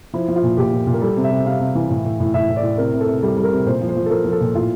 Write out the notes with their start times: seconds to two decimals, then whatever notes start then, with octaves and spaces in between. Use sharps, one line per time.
0.13 F3 E4
0.28 F3
0.36 F4
0.43 A#2
0.57 A#2 G4
0.73 A#2
0.87 A#2
0.94 A#4
1.01 G3 A4
1.17 C3
1.24 E5
1.30 C3
1.46 C3 F5
1.60 C3
1.75 E3
1.90 A2
2.05 A2
2.20 A2
2.34 A2 E5
2.49 A2
2.56 D5
2.63 A2
2.78 C3 A#4
2.93 C3
3.01 A4
3.07 C3
3.23 G3 A4
3.37 G3
3.44 A#4
3.52 C3
3.66 A#2 C5
3.81 F3
3.89 C5
3.96 F3
4.06 A4
4.10 F3 A#4
4.25 F3
4.32 A4
4.40 A#2
4.54 A2 F4